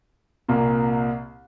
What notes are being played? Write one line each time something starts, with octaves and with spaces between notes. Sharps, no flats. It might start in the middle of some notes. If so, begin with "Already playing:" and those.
C2 A#2 A#3